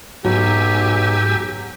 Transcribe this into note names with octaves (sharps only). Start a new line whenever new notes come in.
B1 G#2 F#3 G4 G#5 E6